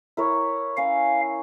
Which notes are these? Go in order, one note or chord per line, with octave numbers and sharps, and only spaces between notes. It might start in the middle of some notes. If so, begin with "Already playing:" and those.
E4 A#4 C#5
C#4 F5